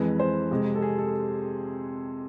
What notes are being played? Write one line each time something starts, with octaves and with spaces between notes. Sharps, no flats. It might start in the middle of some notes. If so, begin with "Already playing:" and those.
Already playing: F2 E3 G#3 B4
C5
F2 C3 G#3
A4
G#4
A4